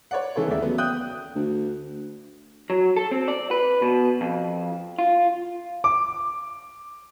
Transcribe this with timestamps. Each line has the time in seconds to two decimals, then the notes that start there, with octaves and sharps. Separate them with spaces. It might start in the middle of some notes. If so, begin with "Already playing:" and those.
0.11 C#5 D5 F#5
0.36 C#3 E3 A4 C#5
0.47 D#2 C#3 A3 D5 E5
0.60 C#3 F#3 B3
0.78 G5 D#6 F#6 G6
1.35 D2
2.70 F#3
2.96 A4
3.11 C4
3.28 D5
3.51 B4
3.82 B2
4.21 F2
4.99 F4
5.84 D6